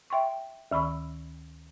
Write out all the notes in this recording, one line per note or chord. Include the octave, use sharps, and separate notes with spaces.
E5 G5 C6 C#6
D2 D#3 B5 C#6 E6